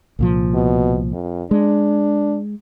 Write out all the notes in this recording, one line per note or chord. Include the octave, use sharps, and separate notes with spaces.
C2 A#2 F3
B2
F2
G#3 D4